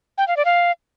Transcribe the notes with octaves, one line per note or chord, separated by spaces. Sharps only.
G5
F5
D5
F5